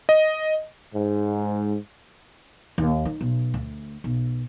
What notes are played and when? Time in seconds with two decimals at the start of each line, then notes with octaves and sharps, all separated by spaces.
0.09 D#5
0.94 G#2
2.78 D#2
3.05 D#4
3.21 B1
3.54 D2
4.04 B1